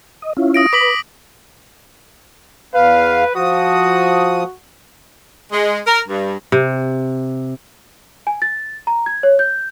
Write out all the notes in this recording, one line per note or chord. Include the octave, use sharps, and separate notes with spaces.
D#5
C#4 E4 F4
D#6 A#6 D7
B4 D6 B6 F#7
E2 B4 F5
F3 F#4 D#6
G#3
A#4
G2
C3
G#5
A6
A#5
G#6
C#5
G6